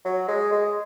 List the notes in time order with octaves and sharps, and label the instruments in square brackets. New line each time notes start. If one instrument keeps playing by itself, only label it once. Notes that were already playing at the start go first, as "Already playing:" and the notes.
[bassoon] F#3
G#3
G#3